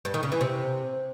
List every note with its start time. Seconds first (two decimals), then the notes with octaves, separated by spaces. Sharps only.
0.05 G2
0.14 D#3
0.23 C#3
0.32 E3
0.41 C3